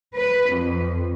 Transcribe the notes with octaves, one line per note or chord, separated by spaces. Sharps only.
B4
F2